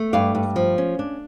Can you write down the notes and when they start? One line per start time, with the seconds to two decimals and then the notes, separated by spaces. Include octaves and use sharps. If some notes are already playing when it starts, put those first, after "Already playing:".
Already playing: A3
0.13 G2 D5 F5
0.35 G2
0.56 F3
0.78 C#4
0.99 D4